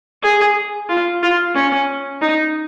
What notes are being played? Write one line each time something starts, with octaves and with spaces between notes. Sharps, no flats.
G#4
F4
F4
C#4
D#4